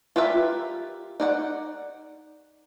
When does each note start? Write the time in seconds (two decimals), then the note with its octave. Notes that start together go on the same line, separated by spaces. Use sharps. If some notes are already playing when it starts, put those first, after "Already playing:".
0.16 F4 G4 A#4 B4 E5
1.20 D#4 D5 F#5